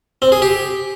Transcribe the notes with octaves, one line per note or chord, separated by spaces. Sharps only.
C4
G#4
G4